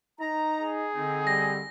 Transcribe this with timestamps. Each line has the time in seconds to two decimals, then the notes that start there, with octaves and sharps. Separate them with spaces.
0.20 D#4 A#5
0.60 G#4
0.95 D3 C4 D#4
1.27 G3 A#6